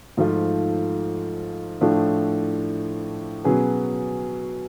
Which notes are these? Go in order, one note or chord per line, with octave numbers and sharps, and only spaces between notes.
G#2 F3 A3 F4
A2 F3 A3 D4
B2 F#3 C#4 G#4 B4